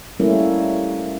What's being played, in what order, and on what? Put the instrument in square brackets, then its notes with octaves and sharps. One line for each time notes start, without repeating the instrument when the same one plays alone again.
[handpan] G3 A3 A#3 C#4 E4